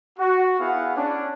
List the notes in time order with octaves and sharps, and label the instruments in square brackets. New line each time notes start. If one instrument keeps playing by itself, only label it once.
[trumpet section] F#4
B3 E4 G#4 F5 F#5
C#4 D4